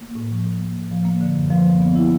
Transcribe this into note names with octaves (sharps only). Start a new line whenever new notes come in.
A#3
A2
F3
A2
A#3
A2
F3
A#3
D3
F#2
F3
A#3
B3
E4